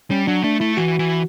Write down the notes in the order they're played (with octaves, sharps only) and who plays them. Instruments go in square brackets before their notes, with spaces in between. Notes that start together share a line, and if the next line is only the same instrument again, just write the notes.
[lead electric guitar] G3 [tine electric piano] C#4
[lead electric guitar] F#3 [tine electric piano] D4
[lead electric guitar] A3 [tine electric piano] D4
[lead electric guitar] A3 [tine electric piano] E4
[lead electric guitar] E3 [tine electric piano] F#4
[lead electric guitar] E3